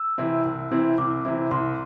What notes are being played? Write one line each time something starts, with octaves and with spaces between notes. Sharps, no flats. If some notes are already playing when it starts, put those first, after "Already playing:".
Already playing: E6
C3 E3 C4 E4
C2
C3 E3 C4 E4
C2 D6
C3 E3 C4 E4
C2 C6